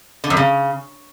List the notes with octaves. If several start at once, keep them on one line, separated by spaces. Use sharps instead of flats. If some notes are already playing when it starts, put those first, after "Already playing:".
D3
F#2
C#3